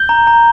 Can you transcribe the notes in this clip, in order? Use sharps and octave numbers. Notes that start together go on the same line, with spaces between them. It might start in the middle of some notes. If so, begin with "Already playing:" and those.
Already playing: G6 G7
A#5
A#5